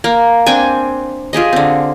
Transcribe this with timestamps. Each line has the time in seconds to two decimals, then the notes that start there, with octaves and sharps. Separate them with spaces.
0.04 A#3
0.46 C4 D4 G5 G#5
1.33 F4 G4 G#4 D#5
1.53 D3 C4